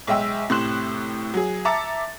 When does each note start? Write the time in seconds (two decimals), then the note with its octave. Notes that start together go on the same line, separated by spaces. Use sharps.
0.07 B1 G#3 E5 G5 E6
0.50 A2 C3 C6 F#6 E7
1.34 F#3 G#4
1.65 E5 A5 A#5 D6 A6 C#7